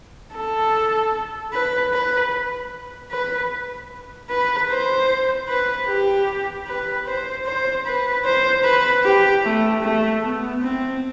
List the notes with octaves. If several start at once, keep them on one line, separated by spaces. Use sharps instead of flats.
A4
B4
B4
B4
B4
C5
B4
G4
B4
C5
C5
B4
C5
B4
G4
A3
A3
B3
C4